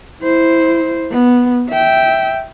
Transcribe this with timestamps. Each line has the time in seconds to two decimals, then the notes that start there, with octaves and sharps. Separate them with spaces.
0.22 E4 C5
1.11 B3
1.69 E5 G5